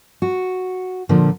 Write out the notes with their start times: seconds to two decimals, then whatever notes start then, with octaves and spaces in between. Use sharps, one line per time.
0.22 F#4
1.09 A#2 D3 F3 A#3